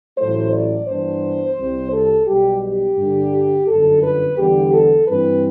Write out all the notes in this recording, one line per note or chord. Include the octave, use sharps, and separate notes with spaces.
A1 A2 F#3 A3 E4 C5
D5
G2 E3 B3 D4 C5
C2 C3 G3
A4
B1 B2 G3 G4
G4
G2 D3 G3 D4
G1 F#2 D3 A4
B4
E2 D3 G3 B3 G4
A4
G2 E3 G3 C4 E4 B4